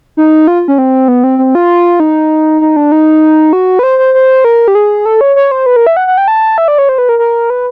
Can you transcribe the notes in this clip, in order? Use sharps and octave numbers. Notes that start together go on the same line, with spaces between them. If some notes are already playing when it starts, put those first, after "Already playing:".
D#4
F4
C#4
C4
B3
C4
C4
F4
D#4
D#4
D4
D#4
F#4
B4
C5
C5
C5
A#4
G4
G#4
A4
C#5
C#5
C5
B4
A#4
E5
F#5
F#5
G5
A5
E5
D5
C#5
C5
B4
A#4
A#4
B4